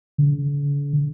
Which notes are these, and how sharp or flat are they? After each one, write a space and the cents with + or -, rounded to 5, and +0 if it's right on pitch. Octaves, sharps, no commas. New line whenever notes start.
D3 -45